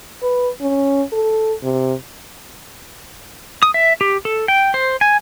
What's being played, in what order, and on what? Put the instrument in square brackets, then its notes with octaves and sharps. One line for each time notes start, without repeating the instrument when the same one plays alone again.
[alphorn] B4
C#4
A4
C3
[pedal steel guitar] D#6
E5
G4
A4
G5
C5
G#5